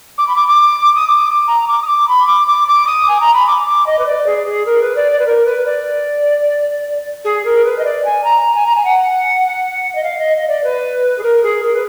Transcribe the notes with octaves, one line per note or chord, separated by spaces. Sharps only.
D6
B5
D6
D6
D#6
D6
A#5
D6
D#6
D6
B5
D6
D6
D6
D#6
G#5
A#5
B5
D6
D6
D#5
B4
D5
G#4
G#4
A#4
B4
D5
D5
B4
A#4
B4
D5
G#4
A#4
B4
D#5
D5
G#5
A#5
G#5
A#5
G#5
F#5
D#5
F5
D#5
D#5
D5
B4
G#4
A#4
G#4
A#4
B4